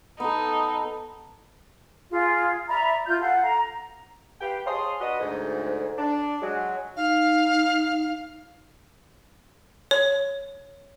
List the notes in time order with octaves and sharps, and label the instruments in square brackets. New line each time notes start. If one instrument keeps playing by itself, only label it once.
[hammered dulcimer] B3 A4 [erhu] D#4
[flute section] F4 G#4
D5 E5 A#5 B5
F4 G6
A4 F5 F#5
A#5
[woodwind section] G4 B4 F5 G5
G#4 C#5 F5 A5 C6 D#6
D4 F#4 B4 D#5
D2 G#2
D4
F#3 G#3
[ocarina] D#4 [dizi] F5
[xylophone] C#5